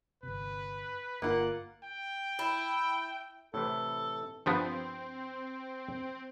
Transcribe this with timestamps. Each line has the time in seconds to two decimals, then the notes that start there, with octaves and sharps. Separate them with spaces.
0.23 G1 C3 B4
1.22 G1 A#3 F4 F#5
1.83 G5
2.39 E4
3.54 A2 C3 E3 A4
4.46 G2 F3 B3 C4